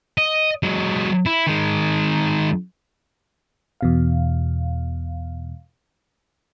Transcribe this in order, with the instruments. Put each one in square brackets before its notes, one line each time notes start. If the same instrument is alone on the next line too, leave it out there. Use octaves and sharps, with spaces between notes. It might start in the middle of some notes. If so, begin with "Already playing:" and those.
[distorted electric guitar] D#5
F#3 G#3
E4
D#3 G#3
[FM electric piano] E2 B2 F5